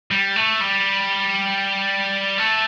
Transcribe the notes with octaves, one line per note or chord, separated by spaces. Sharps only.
G3
A3
G3
A3